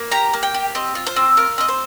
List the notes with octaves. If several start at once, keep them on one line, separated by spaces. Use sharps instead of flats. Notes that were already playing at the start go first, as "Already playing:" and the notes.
Already playing: A#3
G4 A#5
A#3
G5
G4
C4 D#5
F4
C5
C4
F4 A#4
C4 D#5
C5